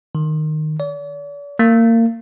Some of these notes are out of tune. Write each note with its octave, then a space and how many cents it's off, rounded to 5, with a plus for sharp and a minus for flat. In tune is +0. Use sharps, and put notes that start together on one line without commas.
D#3 -15
D5 -45
A#3 -30